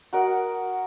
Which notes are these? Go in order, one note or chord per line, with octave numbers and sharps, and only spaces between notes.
F#4 A#4 D#5 F#5